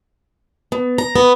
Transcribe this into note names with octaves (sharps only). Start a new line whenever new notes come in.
B3
A#5
B3